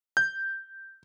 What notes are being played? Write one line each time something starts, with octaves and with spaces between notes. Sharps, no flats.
G6